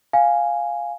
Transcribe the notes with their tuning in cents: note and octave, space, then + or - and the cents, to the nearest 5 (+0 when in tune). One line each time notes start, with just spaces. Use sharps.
F5 +0 G#5 +0